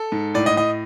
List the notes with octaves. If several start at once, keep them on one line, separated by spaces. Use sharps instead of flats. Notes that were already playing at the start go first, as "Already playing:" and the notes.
Already playing: A4
G#2
A2 D5
D#5
A2 D#5